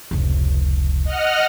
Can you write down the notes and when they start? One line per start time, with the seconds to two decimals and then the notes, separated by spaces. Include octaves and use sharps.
0.11 F1 C#2
1.04 D#5 F#5 F6